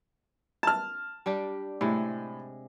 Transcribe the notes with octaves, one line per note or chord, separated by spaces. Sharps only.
A5 F6
G3 D4 G4
A2 C3 G#3